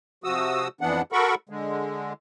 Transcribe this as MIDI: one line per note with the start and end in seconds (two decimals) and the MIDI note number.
0.24 0.68 48
0.24 0.68 53
0.24 0.68 66
0.24 0.68 87
0.24 0.68 88
0.81 1.02 41
0.81 1.02 52
0.81 1.02 59
0.81 1.02 62
0.81 1.02 78
1.12 1.35 66
1.12 1.35 69
1.12 1.35 70
1.12 1.35 78
1.12 1.35 83
1.12 1.35 85
1.49 2.13 50
1.49 2.13 56